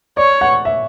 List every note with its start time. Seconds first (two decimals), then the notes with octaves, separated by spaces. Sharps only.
0.17 C#5 D5
0.41 F#5
0.65 E5